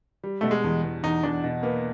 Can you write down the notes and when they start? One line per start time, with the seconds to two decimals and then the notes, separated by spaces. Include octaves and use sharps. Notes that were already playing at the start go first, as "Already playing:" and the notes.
0.24 G3
0.41 B2 A3
0.51 G#3
0.64 E2
0.84 E2
1.03 E2 D#4
1.23 E2 D4
1.44 B2
1.63 A#3 B3